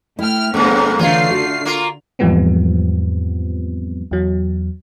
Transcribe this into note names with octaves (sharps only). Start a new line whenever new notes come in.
A3 E4 G5 F6
F#2 A#2 C#3 A3 B3 C4 A#4
D3 E3 A3 F4 C#5 F5 C7
F#4
A#3 F4
E2 G#2 F3 G3 B3 C4
E2 F#3